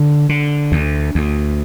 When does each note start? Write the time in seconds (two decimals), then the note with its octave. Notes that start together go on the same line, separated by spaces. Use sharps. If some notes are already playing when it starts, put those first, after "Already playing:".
Already playing: D3
0.29 D3
0.72 D2
1.15 D2